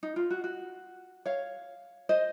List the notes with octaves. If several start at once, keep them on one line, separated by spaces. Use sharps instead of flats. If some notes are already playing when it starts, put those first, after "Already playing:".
D#4
F4
F#4
F#4
C#5 F5
C5 D#5